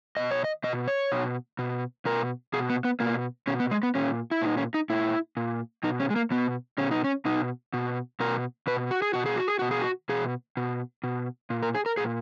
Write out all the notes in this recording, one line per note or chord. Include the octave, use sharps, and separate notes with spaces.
B2 D#5
C#5
D#5
B2 D#5
C#5
B2
B2
B2 A#4
B2 G#4
B3
B3
B2 A#3
B2 C#4
B3
G#3
B3
A#2 C#4
E4
A#2 D#4
C#4
D#4
A#2 E4
A#2
B2 D#4
C#4
G#3
A#3
B2 B3
B2 C#4
D#4
C#4
B2 D#4
B2
B2 A#4
B2 B4
F#4
G#4
B2 F#4
G#4
F#4
G#4
B2 F#4
G#4
F#4
B2 G#4
B2
B2
A#2
A#4
G#4
A#4
A#2 G#4